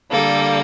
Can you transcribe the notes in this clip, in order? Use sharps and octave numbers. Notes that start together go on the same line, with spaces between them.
D3 G3 A#3 A4